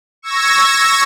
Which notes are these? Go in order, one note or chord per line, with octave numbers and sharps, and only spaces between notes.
C#6 E6 G#6 A#6